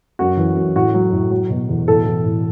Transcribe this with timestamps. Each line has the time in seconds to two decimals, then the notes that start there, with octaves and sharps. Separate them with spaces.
0.19 F#2 F#4
0.37 E3
0.56 F#2
0.76 A2 F#4
0.94 F#3
1.13 A2
1.31 F#3
1.50 B2
1.69 E2
1.88 A2 A4
2.06 E3
2.24 A2